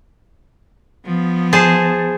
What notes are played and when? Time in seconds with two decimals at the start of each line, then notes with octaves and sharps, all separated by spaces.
1.05 F3 B3
1.53 G#4 C5 A5